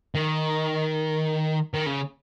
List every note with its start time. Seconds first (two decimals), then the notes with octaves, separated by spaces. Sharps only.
0.15 D#3
1.74 D#3
1.86 C#3